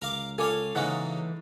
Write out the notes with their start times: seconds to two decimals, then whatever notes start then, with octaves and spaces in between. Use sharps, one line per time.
0.02 C#2 A#4 F5 D6
0.38 F4 A4 C#5 F5 G#5 D6
0.75 G#2 C#3 E3 F#3 A#3 F#5